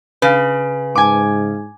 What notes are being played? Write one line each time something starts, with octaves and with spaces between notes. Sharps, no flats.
C#3 B4
G#2 G#5 D6